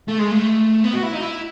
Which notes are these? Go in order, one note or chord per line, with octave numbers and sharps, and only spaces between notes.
A3
G#3
A3
B3
F#4
E4
D#4
E4